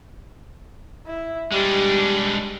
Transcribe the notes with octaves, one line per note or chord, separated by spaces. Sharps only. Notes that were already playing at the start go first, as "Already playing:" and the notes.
E4
G3 G#3 D4